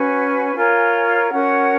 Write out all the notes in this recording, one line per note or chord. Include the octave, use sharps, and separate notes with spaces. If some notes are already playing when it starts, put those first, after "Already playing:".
Already playing: C#4 F#4 B4 G#5
F4 A#4 C#5
C#4 F#4 A#4 C#5 F#5